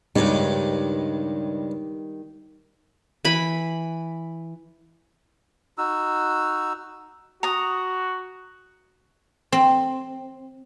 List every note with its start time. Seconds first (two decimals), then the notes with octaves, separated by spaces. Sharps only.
0.16 C#2 G2 D#3 G3 D#4
3.25 E3 B5
5.78 D#4 F#4 E6
7.43 F#4 A#5 D#6
9.52 C4